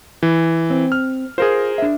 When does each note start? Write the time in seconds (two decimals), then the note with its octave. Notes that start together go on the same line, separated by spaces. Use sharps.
0.23 E3
0.70 C4
0.92 F6
1.38 F4 G#4 A#4 C5
1.78 D4 E5